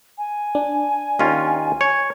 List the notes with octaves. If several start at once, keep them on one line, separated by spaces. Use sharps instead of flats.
G#5
D4
D#2 C#4 F4
C#5